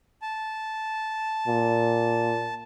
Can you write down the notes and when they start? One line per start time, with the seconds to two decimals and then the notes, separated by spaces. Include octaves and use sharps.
0.22 A5
1.47 A#2